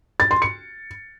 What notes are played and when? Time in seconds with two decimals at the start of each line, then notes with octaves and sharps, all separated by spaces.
0.20 A6
0.31 C6
0.42 C#7